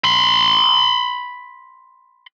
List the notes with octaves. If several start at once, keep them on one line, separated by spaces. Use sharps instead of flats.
B5 C6